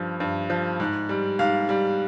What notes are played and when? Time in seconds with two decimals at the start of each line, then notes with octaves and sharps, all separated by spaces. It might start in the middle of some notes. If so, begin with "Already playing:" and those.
Already playing: G2 F3
0.20 G2
0.50 F3
0.80 G#2
1.09 G3
1.39 G#2 F5
1.69 G3